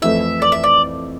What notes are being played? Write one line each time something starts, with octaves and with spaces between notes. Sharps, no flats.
F2 E3 A3 E4 E5
D5
E5
D5